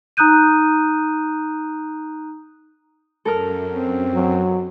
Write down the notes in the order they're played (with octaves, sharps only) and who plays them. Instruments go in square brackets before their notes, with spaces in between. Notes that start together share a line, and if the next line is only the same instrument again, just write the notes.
[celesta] D#4 A#5 D#6 F#6 G6 D#7
[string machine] F#2 [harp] A4 A#4 F6
[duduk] C4
[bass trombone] F#3